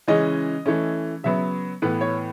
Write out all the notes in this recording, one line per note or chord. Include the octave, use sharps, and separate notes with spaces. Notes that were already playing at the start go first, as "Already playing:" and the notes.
C#3 E3 G#3 C#4 D#5
E3 A3 C#4
C#3 F#3 B3 E5
A2 E3 B3 B4
C#5